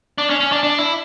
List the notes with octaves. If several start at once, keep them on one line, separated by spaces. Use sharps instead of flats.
D4
C#4
C#4
D4
D4
E4